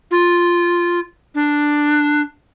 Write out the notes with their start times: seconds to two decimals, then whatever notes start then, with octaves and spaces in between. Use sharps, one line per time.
0.11 F4
1.35 D4